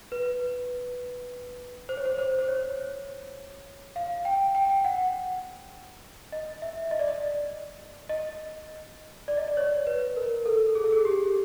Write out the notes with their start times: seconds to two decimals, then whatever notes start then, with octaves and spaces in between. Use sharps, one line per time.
0.12 B4
1.89 C5
1.97 C#5
2.06 C5
2.19 C5
2.39 C5
2.48 C#5
3.96 F5
4.25 G5
4.55 G5
4.70 G5
4.84 F#5
6.32 D#5
6.62 E5
6.91 D#5
6.99 D5
7.08 D#5
8.09 D#5
9.28 D5
9.37 D#5
9.48 D5
9.57 C#5
9.87 B4
10.17 A#4
10.46 A4
10.75 G#4
10.84 A4
10.92 G#4
11.05 G4